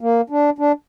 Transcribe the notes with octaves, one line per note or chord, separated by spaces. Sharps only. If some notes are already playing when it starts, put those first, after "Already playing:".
A#3
D4
D4